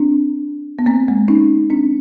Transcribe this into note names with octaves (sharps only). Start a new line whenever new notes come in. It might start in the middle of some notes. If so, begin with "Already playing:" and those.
Already playing: C4 D4
B3
A#3 C4
G#3 A#3
C#4 D#4
C4 D4